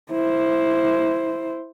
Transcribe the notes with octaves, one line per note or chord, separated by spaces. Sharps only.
E4 C5